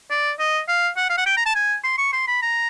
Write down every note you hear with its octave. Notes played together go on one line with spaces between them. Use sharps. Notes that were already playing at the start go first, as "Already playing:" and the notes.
D5
D#5
F5
F#5
F5
F#5
G5
A#5
A5
G#5
C6
C#6
C6
B5
A#5